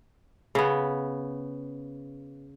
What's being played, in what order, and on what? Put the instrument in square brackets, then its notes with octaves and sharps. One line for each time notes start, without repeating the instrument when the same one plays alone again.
[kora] C#3 B3